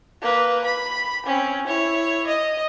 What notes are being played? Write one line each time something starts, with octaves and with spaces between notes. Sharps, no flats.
A#3 B4
B5
C4 C#4
E4 C#5
D#5